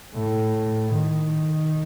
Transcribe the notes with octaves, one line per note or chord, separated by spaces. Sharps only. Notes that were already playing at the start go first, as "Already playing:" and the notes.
A2
D#3